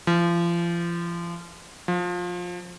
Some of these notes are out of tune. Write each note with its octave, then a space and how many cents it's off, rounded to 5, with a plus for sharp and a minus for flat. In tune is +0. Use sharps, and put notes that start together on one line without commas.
F3 -35
F3 +20